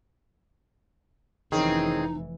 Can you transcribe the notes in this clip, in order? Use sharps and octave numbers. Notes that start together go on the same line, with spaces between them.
F1 D#3 E3 C4 C#4 D#4 G#4